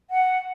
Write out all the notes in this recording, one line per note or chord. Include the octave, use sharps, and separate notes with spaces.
F#5